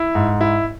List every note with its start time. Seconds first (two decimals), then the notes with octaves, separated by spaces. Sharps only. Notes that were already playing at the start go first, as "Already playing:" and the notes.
Already playing: E4
0.15 G#2
0.41 E4